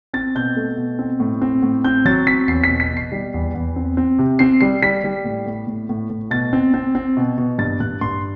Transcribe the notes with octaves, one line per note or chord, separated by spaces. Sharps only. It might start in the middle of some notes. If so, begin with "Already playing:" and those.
C4 A6
B2 G6
A3
B2
C4
A2
C4
A2
C4 G6
F#3 A6
C4 B6
E2 C7
B6
B2
B6
B2
C7
G3
E2
E2
C4
C4
C3
C4 C7
G3 C7
G3 B6
G3
A2
A2
A2
A2
A2
B2 A6
C4
C4
C4
B2
B2
G2 A6
G2 F#6
G2 C6